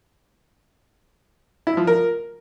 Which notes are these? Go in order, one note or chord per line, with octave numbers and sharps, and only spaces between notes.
E4
F3
A#4